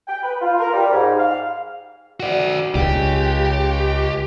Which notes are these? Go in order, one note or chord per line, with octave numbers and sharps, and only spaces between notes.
G5
B4
F4
A#4
G3
G#2
F5
F#4 D5
C#2 G4